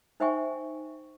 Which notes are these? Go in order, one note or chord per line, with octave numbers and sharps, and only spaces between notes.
D#4 C5 E5 G5 G#5 C#6